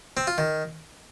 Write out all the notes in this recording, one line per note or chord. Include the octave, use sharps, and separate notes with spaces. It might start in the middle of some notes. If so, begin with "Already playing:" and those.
C4
F4
D#3